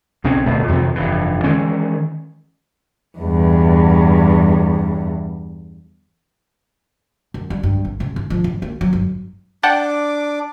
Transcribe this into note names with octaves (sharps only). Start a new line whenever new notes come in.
B1 C#3 C4 C#4
D1 B2 A3 B3
F2 C3 D#3 E3
F1 G2 E3
D#3 E3 G#3 C#4
E2 G2
F#2
G3
G2
G#1
C#3
G#2
F3
A1
A#3
F#3
G1
D4 F#5 G5 A5 D6